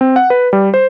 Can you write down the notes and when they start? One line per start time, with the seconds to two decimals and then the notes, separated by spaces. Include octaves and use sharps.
0.01 C4
0.16 F#5
0.30 B4
0.53 G3
0.74 C5